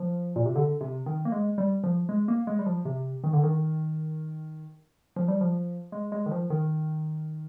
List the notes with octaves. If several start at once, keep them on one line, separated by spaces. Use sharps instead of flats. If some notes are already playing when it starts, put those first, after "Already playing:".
Already playing: F3
A#2
C3
D3
C3
D#3
A#3
G#3
G3
F3
G#3
A#3
G#3
G3
F3
C3
D#3
D3
D#3
F3
G3
F3
G#3
G#3
D#3
F3
D#3